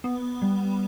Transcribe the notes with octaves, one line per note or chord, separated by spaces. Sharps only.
B3
G3